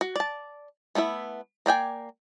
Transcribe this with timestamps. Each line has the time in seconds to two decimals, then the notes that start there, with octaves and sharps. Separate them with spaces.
0.01 F#4
0.16 D5 A5
0.95 A3 B3 E4 E5
1.66 A#3 D5 G5 G#5